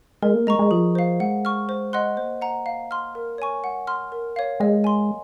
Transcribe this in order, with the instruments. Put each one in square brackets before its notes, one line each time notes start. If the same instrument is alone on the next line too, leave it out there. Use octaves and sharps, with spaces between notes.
[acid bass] G#3 [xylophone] A#4
[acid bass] A#3
[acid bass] G#3 [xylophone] D#5 A#5 C#6
[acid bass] G#3
[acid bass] F3 [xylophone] G#4
[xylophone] C5 F5
[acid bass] G#3 [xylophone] F#5
[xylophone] C#6 F6
C5
D#5 F#5 C6 F#6
[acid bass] A#3 [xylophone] C5
[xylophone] F#5 A#5
F5
C6 F6
A#4
C#5 G#5 C#6
[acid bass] G#3 [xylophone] F#5
[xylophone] C6 F6
[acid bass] A#3 [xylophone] A#4
[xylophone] C#5 F5
[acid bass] G#3 [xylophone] D#5
[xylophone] G#5 C6